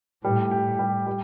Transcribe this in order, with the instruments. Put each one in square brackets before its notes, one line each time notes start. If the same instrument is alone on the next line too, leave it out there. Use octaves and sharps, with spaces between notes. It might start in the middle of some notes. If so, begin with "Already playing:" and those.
[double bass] A2 [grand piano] G3
[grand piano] G4
G3
G3